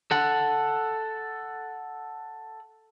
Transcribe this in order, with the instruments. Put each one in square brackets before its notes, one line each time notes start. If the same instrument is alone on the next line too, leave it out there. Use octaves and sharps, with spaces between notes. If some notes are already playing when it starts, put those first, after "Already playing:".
[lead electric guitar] A4 F#5